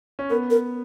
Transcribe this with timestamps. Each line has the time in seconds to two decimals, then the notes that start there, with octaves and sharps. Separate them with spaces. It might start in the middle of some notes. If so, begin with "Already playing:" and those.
0.19 C#4
0.30 B3 A#4
0.50 A#4